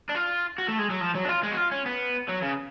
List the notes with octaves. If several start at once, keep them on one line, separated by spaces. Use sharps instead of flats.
D4
F4
F#4
A3
G#3
F#3
F3
F#3
D4
F4
G#3
F#4
F4
C#4
B3
F#3
C#3